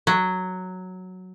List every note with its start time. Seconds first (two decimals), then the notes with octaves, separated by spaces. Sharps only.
0.07 F#3